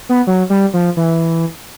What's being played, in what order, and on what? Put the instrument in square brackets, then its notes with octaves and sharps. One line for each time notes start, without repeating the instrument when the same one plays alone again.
[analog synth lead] B3
F#3
G3
F3
E3